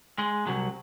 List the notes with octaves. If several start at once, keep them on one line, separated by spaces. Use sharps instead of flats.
G#3
C2 F#3